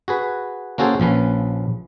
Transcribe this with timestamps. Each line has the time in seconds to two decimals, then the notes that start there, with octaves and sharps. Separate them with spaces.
0.08 F#4 G#4 B4
0.78 A#3 C#4 F#4 G#4 A4 C5
1.00 A#1 F3 C#4 B4